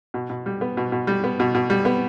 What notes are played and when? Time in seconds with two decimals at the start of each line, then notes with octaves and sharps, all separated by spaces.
0.14 B2
0.30 B2
0.46 G3
0.61 B3
0.77 B2
0.92 B2
1.07 G3
1.24 B3
1.40 B2
1.55 B2
1.70 G3
1.85 B3